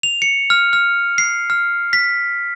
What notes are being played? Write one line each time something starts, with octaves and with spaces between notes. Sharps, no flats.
F7
C#7
F6
F6
C7
F6
B6